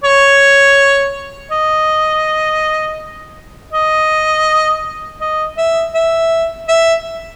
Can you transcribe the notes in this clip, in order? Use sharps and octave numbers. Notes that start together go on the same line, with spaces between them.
C#5
D#5
D#5
D#5
E5
E5
E5